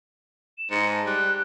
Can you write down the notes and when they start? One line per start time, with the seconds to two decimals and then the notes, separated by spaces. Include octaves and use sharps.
0.58 E7
0.71 G#2 C#7
0.92 A5
1.06 G3 F#6